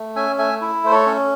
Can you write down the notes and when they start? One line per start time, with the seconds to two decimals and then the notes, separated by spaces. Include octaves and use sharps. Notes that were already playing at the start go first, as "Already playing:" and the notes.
Already playing: A3
0.16 C#4 E5 G#5
0.38 A3 E5 G#5
0.61 E4
0.84 A3 C5
0.91 A4 C#5
1.06 C#4